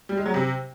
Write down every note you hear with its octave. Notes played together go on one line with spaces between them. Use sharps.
G3
G#3
F#3
C3